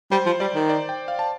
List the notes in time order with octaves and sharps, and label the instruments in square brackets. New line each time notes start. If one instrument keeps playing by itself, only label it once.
[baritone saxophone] G3 [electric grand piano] C5
[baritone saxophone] F3
[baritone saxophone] G3 [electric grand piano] D5
[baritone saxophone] D#3
[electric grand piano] D5
G5
F5
A5